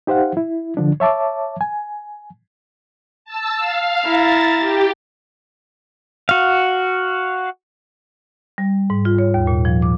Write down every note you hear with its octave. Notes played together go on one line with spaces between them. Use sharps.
D#4 G4 C5 F5 F#5
E4
D3 F3 D4
C#5 E5 A5 D6
G#5
A5 E6
F5
E4 A#5 A6
G4
F#4 F5
G3
G#2
F4
C#5
D#2
A#2
F3
D6